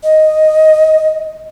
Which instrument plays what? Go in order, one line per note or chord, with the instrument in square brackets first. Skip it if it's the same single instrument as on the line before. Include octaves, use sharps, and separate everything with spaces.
[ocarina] D#5